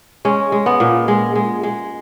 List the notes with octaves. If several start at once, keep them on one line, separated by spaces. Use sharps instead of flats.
G#3 C#4
G#3
B3
A#2
G#3
G#3
G#3